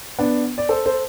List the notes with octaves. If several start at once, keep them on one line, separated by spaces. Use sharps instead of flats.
B3 D4
D5
A4 C5
A4 C5